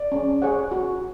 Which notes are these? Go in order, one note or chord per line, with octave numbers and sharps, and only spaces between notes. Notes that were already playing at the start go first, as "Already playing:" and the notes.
Already playing: D5
C#4
G#4 C#5 F#5
F#4